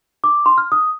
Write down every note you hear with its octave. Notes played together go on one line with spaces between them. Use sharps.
D6
C6
F6
D#6